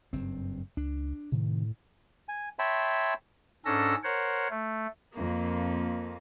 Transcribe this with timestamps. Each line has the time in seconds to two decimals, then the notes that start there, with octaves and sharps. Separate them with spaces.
0.13 F#1 G2 C4
0.77 C#2 D4
1.32 A2 C3 D#3
2.29 G#5
2.59 C#5 E5 G5 A5 B5 C6
3.65 G#2 C#4 D4 A4 E6 A#6
4.03 A#4 C5 C#5 F#5
4.50 A3
5.16 F2 A#3